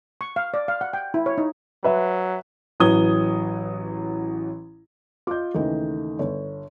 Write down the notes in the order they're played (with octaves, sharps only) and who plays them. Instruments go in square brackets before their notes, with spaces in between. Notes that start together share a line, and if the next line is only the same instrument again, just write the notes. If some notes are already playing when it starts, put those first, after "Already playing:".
[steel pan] C#6
F5
D5
F5
F#5
G5
E4
C#5
D#4
[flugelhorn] F#3 [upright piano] B4 E5
[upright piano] A1 E3 F#3 D#6 G#6 G7
[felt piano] F4 D#5 [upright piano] D6 G6
[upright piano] D#2 C#3 E3 [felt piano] A3 D#4 D#5
[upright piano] G1 [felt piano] C#5